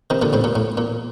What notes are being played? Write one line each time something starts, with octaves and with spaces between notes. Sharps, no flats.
C3 D#3
A#2 D3
A2 C3
A#2
A2
A#2